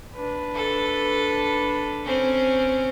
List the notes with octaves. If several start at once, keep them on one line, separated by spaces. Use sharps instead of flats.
D4 B4
A4
C4 C#4